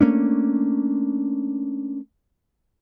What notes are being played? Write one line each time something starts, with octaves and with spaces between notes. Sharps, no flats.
A3 A#3 C#4 D4